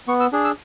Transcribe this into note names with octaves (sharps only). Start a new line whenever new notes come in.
B3 C#6
E6
D4 G#4
E6